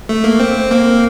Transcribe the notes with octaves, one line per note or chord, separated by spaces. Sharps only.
A3
A#3
C4
A#3